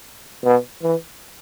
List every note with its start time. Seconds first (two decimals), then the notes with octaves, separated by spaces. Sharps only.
0.44 B2
0.82 E3